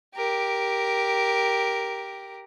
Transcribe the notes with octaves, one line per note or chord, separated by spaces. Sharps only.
G4 A#4